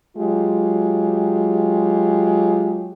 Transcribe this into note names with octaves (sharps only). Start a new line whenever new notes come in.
F#3 G#3 F4 G4